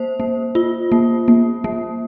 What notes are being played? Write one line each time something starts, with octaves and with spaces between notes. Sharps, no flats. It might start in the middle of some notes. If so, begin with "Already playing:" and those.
Already playing: A#3 C5
A#3
F4
A#3
A#3
A#3